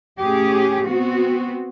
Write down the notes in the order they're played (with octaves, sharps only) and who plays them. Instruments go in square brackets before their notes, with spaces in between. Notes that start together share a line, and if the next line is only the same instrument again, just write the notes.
[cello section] A2 C#4 G4 G#4
B3 C4 F#4